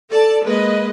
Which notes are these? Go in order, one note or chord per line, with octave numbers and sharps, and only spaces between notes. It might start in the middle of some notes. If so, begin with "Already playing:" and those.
A4 D5 A5
G#3 A#3 B4 D#5